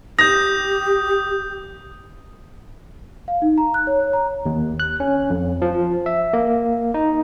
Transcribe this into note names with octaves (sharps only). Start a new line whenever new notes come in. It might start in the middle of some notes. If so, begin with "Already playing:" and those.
G4 D#6 G6 A#6
F5
D#4
A#5
F#6
C#5
C#5
A#5
D#2
F#6
C#4
F2
F3
E5
A#3
D#4